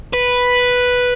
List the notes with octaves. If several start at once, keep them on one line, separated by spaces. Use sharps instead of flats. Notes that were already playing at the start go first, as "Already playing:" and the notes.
B4